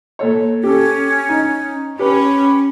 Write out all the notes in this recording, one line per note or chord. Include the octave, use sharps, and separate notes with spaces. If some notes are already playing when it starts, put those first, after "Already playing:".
A#2 A4 C#5
C#4 G4 A4
D#4
C#4 G4 B4 B5